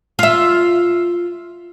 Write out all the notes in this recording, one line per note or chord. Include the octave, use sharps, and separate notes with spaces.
F4 E5